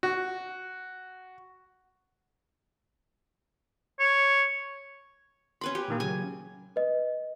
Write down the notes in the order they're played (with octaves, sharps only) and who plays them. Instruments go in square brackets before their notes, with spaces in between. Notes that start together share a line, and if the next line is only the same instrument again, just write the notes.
[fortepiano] F#4
[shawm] C#5
[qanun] C#4 B4 B5 [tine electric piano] C6
[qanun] G4
[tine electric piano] A#2 D#3 A#3
[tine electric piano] C#3 F#3 [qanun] G#5
[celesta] B4 D#5